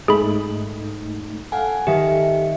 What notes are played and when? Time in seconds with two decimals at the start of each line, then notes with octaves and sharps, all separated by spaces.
0.08 G#2 A3 D#4 G#4 B5
1.52 A4 F5 F#5 G#5
1.87 D#3 G4 E5